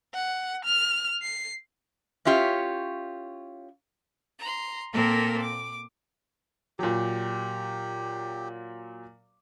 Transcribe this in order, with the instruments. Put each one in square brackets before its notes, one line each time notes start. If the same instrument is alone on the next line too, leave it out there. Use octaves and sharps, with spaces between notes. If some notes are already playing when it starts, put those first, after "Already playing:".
[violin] F#5
F6
C7
[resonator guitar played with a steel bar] C#4 E4 F4 G4 C#5
[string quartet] A#5 C6
A#2 A#3 C4 A4 A#4
D6
[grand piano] A#2 F#3 [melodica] G4